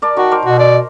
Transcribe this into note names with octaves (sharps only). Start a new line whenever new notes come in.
A#4 D5 A5
D#3 F#4 A#4 C#6
A#4 C5 D6
B2 F#4
D5